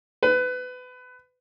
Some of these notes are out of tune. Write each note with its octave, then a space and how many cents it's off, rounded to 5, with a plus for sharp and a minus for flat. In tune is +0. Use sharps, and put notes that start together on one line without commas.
B4 +25